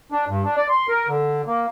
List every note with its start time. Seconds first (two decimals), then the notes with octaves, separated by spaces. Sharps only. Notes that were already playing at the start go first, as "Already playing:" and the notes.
0.12 D4
0.28 G2
0.44 D4
0.56 D5
0.69 C6
0.88 A#4
1.08 D3
1.47 A#3